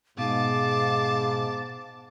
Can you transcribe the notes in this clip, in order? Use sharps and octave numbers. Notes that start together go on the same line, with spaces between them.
G#2 B2 F5 A5 D6